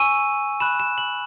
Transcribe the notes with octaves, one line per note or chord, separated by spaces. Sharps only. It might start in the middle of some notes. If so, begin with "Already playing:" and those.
Already playing: G#5 C#6 E6 D#7
B5 F#6 E7
E7
F#7